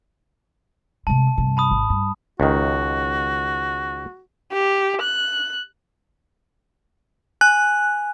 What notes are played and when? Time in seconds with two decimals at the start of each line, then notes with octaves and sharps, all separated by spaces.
1.07 C3 G#3 A5
1.38 G2 C3
1.57 A5 B5 D#6
1.71 G#1
1.90 G2
2.40 C#2 D#3 F#4
4.53 G4
5.02 F#6
7.41 G#5 F#6